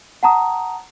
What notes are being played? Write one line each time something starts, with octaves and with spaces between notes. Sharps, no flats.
F#5 A5 A#5 D#6